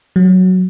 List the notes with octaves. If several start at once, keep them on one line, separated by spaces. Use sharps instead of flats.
F#3